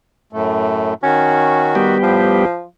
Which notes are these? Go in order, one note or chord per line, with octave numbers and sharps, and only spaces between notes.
F#2 A2 A3
D#3 C#4 F#4
G3 B3 G4
A2 F3